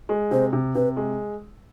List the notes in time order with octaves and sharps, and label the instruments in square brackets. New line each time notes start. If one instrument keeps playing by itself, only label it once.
[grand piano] G#3
[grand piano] C3 [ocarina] C5
[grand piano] C3
[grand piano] C3 [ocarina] B4
[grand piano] G#3